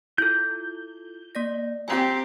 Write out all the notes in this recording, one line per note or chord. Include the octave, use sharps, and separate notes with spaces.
E4 F4 A4 G6
A#3 D5 A#6
C4 G4 G#5 A#5 G#6